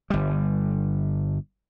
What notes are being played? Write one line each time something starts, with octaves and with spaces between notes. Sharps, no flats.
G1 G3